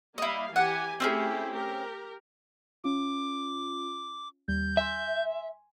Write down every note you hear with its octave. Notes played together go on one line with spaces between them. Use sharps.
G3 A#3 E4 D#5 F5
E3 G4 F#5 G#5
A3 C4 C#4 E4 G4 G#4
G4 A#4
C#4 F4 D6
D#2 G3 G6
E5 G#5 C6